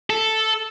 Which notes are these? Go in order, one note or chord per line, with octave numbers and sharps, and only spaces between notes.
A4